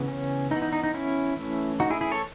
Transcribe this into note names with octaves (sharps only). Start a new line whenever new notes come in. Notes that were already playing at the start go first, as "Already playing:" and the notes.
Already playing: C#3 E3 B3
C#4
E3 B3 D#4
D#4
D#4
D#4
C#4 E4
E3 A3 C#4
D#4 F#4
E4 G#4
E4 G#4
A4 C#5